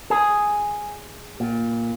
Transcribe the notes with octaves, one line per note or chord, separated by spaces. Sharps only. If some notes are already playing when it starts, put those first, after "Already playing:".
G#4
A#2